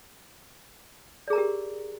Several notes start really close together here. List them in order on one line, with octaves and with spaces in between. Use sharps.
D5 G#4 A#5 A#4 G4